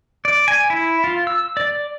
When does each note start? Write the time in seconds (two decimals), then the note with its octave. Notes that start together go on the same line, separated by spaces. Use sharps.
0.25 D5
0.48 G#5
0.70 E4
1.04 F4
1.27 E6
1.57 D5